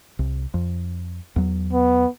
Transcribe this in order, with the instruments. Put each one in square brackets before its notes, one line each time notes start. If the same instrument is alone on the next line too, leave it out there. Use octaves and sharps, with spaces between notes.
[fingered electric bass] C2
F2
E2 F#3
[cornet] B3